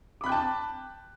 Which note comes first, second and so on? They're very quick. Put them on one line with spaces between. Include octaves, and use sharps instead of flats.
D6 B5 F#6 G5 A5